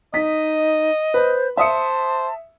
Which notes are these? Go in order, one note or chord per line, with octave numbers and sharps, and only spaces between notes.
D#4 D#5 B6
B4 C5
C5 E5 A5 D#6 C#7